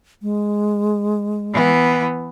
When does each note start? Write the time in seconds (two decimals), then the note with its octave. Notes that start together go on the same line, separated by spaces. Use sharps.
0.22 G#3
1.53 E3 B3